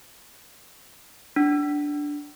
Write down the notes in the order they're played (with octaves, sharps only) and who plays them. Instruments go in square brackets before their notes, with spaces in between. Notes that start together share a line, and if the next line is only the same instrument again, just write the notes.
[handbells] D4